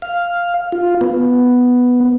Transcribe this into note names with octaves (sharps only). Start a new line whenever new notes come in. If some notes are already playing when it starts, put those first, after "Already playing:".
F5
F4
B3